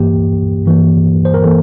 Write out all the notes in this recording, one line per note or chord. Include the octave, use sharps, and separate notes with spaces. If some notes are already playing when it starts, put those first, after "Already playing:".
Already playing: G2 E3 A#3 G4
G2 E3 A#3
C5
A#4
E3 A#3 A4